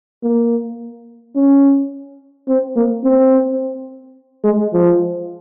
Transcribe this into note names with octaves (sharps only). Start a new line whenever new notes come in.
A#3
C#4
C4
A#3
C4
G#3
F3